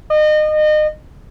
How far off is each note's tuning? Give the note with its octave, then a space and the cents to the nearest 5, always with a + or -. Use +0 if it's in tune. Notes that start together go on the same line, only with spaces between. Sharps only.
D#5 -30